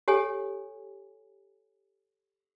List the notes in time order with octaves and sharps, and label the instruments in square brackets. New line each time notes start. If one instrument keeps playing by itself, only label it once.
[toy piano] G4 A4 C#5 G#5